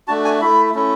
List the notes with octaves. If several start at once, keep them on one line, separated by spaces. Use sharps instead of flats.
A3 D4 F#4 A5
G#5
A3 E4 B5
A3 C#4 E4